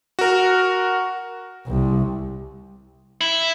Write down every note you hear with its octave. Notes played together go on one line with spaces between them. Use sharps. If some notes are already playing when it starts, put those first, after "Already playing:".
F#4 A#4
C2
E4